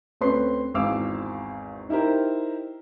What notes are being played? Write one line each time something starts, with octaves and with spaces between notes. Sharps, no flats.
D2 C4 C#4 B4 C6 C7
G#1 E2 C4 F5 D6 E6
D#4 E4 G4 A#4 C5